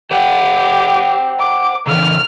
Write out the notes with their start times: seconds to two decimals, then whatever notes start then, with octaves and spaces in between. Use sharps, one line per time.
0.11 G4 C5 F#5 G5
1.39 D6
1.87 C#3 E3 F6